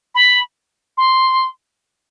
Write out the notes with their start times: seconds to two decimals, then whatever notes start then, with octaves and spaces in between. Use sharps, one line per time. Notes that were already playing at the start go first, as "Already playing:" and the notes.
0.15 B5
0.97 C6